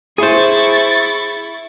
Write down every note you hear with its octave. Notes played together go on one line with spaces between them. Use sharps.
E4 G#4 C5 C#6 A6